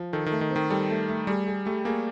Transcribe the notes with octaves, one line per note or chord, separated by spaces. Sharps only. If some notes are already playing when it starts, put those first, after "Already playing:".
Already playing: F3
D#3 A4
D#3
A3
D#3
C4
D#3
G3 A4
A3
A3
G3 G#4
G#4
G3 A3
A#3 G#4